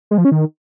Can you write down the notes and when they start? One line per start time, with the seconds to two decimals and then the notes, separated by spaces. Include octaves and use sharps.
0.11 G#3
0.18 F3
0.25 C#4
0.32 D#3